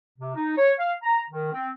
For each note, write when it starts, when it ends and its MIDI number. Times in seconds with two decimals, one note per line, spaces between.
0.18 0.35 48
0.35 0.53 63
0.58 0.73 73
0.79 0.93 77
1.02 1.22 82
1.30 1.52 51
1.53 1.69 60